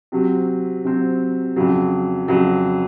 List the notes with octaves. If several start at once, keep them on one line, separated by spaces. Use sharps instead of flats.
C3 F#3 C4
C3 F#3 C4
F2 C#3 F#3
F2 C#3 F#3